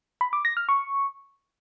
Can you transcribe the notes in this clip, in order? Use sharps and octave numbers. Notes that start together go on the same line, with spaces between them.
B5
D6
A#6
F6
C#6